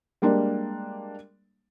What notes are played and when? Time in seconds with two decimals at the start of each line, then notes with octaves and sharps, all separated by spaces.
0.22 G3 G#3 A#3 D4